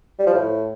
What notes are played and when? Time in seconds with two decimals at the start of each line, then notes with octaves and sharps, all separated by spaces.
0.19 G3
0.27 F3
0.34 A2